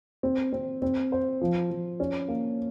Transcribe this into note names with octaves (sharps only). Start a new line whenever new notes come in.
C4
C4
C4
C5
F3
F3
C#4
A#3